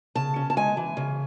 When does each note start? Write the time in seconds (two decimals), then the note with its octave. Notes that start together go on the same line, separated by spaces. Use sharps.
0.15 C#3 A5
0.36 C#4
0.50 A5
0.57 G#3 G#5
0.77 E3
0.97 C#3